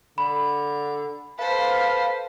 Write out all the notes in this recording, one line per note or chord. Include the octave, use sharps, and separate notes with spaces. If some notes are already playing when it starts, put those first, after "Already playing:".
D3 B5
A4 B4 C5 F5